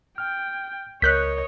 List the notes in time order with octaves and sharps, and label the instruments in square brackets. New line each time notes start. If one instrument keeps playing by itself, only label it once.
[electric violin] G5 [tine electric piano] F6
[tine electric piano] C#2 A#4 [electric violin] C#5 D#5 [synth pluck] F#6 G6 B6